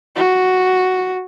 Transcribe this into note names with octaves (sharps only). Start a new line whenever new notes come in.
F#4